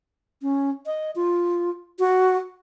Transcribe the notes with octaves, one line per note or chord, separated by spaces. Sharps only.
C#4
D#5
F4
F#4